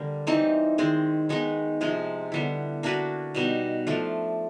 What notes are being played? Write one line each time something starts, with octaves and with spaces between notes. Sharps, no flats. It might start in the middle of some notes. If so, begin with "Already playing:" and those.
Already playing: D3 G3 A#3
E3 G3 C4 D#4
D#3 G#3 C4
D#3 G#3 B3 D#4
C3 F3 G#3
D3 G3 B3 E4
A#3 D4 F#4 B4
B2 G3 B3 D#4
F3 A3 D4 F4